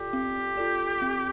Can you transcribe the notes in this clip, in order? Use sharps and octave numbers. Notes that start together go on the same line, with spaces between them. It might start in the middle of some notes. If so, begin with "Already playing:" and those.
Already playing: F4 G4 A4 D5
C4
F4 A4 D5
C4